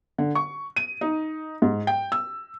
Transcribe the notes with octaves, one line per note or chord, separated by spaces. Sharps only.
D3
C#6
D#7
D#4
G#2
G5
E6